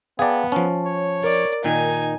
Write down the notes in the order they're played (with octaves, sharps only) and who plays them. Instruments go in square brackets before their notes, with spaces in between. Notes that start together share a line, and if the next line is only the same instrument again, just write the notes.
[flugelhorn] B3 [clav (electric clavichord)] G#4 D5 [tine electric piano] F5 G5 A5
[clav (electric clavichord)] F3 C#4 [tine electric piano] A5
[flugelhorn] C#5
[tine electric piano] A#4 [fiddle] D5
[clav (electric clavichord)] A#2 D#3 [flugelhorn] D#4 [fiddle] G#5